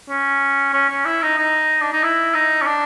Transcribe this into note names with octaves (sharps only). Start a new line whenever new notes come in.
C#4
C#4
C#4
E4
D#4
D#4
D4
D#4
E4
D#4
C#4
D4